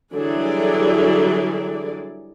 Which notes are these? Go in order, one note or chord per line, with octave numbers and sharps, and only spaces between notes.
D3 E3 F#3 G3 G#4 D5